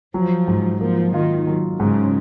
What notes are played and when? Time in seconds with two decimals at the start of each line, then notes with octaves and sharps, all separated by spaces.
0.14 F3 F#3
0.48 G#2
0.80 F3 A#3
1.13 D#3 F4
1.47 F#3
1.80 G#2 C#3